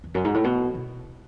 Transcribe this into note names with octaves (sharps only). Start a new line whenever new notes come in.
E2
F#2
G#2
A2
B2
B2